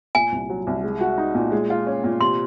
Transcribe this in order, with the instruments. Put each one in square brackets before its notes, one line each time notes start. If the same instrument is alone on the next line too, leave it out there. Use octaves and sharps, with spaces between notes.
[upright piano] A#2 [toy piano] G#5
[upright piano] C2
F#3
C2
G#3
F#4
D#4
A#2
G#3
F4
C#4
A#2
[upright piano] C3 [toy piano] C6